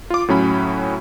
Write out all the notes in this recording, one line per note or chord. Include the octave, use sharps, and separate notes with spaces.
F4 D6
A2 F#3 C#4 B5